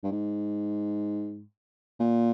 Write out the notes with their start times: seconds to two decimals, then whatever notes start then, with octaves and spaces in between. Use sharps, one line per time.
0.03 G2
0.11 G#2
2.00 A#2